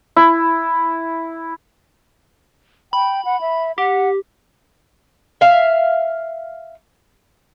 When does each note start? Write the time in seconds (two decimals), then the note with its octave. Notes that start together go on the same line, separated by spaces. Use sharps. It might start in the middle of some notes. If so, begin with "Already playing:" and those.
0.16 E4
2.93 G5 B5
3.25 F#5
3.41 E5
3.78 G4 F#5
5.41 E5 F5